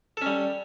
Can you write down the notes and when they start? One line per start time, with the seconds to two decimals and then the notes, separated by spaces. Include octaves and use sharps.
0.17 A4
0.22 C#4
0.26 G3